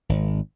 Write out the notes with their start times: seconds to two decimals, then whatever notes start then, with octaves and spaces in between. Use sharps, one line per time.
0.09 G#1